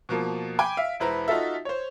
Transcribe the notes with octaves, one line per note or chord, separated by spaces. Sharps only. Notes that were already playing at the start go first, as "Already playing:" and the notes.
B2 F3 A#3
G5 G#5 B5 D6 D7
E5 F5
E1 E4 B4 C5 A#5
D#4 F4 F#4 A4 E5
C5 C#5